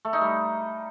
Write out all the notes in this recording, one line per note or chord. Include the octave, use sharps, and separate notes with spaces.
A3
D#4
G3